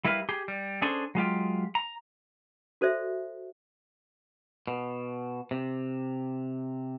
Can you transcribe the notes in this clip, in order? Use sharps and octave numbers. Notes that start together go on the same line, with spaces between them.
G3 E4 A#4 B4 F5
G4 G#4
G3
C#4 D4 G#4 A4 C5
F#3 G#3 F4 G4
A#5
F#4 A4 C5 D5 E5
B2
C3